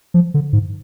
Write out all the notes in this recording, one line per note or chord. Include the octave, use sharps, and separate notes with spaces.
F3
D3
G#2